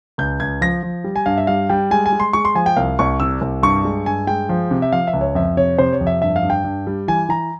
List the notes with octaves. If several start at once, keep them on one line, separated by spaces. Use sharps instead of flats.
C#2 G6
C#2 G#6
F3 A#6
F3
G3
G#5
G2 F5
E5
G3 F5
G3 G5
G#3 G#5
G#5
G#3
C6
G#3 C#6
C6
F3 G#5
G5
C2 F5
C2 C#6
C3 E6
C2
G2 C#6
G#3
G2 G#5
G#3 G5
F3
C3
E5
F3 F5
E5
C#2
C#5
F2 E5
C3 C#5
C3 C5
C#5
F2
E5
G2 E5
F5
G2
G5
G2
G3
E3 G#5
E3 A#5